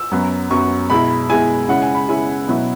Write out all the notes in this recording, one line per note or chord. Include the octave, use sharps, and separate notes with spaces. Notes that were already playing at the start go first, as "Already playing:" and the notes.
Already playing: E6
F#2 F#3 B3
F#2 F#3 B3 C#6
B2 G#3 E4 B5
B2 G#3 E4 G#5
C#3 G#3 C#4 E4 F#5
G#5
B5
C#3 G#3 C#4 E4 G#5
B2 F#3 B3 E4